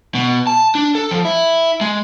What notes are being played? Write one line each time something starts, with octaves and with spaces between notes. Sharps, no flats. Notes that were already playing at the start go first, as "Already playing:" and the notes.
B2
A5
D4
A4
F3
E4
G#3